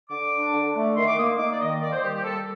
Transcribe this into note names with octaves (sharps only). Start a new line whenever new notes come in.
D3 D6
D4
D3
A3
D#3 C6
D6
A#3 D#6
D#4 D6
D5
D#3 D#5
A#3 D5
C5
G3 G4
G4
G3 A4